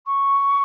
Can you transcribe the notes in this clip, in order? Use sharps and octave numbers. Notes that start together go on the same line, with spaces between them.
C#6